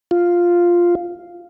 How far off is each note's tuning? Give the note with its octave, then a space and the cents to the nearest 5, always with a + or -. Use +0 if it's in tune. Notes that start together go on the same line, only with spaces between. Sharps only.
F4 +0